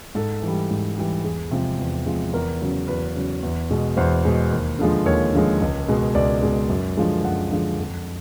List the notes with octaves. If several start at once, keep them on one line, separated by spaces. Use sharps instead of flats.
G#2 A4
E3
G3
G#2
E3 G3
E2 G#4
C3 F3 G#3
E2
C3 F3 G#3
E2 A#4
C#3 F#3
E2 B4
C#3 F#3
E2
B2 G#3
E2 C5
B2 G#3
D#2
D3 F3 G#3
D#2 C#5
D3 F3 G#3
C#2
B2 G#3
C#2 D5
B2 G#3
F#2
D3 F3 G#3
F#2 F#5
D3 F3 G#3
F2